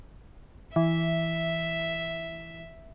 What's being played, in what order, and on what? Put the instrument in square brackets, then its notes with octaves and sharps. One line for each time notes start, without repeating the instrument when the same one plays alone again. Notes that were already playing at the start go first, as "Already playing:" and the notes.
[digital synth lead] E3 [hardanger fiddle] E5